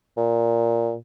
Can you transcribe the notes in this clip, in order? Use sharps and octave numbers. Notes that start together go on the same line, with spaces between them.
A#2